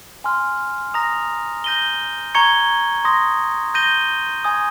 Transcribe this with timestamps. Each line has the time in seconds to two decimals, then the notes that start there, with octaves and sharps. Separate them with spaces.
0.24 G#5 C6 F6
0.94 A#5 D#6 A#6 F7
1.64 G6 A#6 D#7 G7
2.35 A#5 C#6 G#6 C#7 G7
3.05 C6 D#6 A#6
3.74 G6 A#6 D#7 G7
4.44 G#5 D#6 G#6